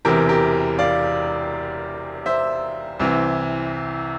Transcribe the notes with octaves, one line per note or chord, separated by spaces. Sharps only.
E1 E2 C3 E3 G4 A#4
G4 A#4
D5 F5
C5 E5
C2 C3 E3